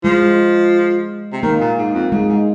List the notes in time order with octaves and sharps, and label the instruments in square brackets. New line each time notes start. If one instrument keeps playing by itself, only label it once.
[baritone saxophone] F3 [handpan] G#3
[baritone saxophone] C3
[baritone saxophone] D#3 [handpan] A#3
[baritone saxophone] A#2
G#2
F2
[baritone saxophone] G#2 [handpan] G#3
[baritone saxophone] G#2